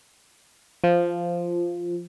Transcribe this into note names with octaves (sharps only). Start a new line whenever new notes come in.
F3